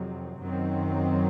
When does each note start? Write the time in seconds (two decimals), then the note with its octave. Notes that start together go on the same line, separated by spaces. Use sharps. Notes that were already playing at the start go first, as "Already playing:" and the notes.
Already playing: F2 C3 D#3 F#3 C4
0.38 F#2 D#3 F#3 C4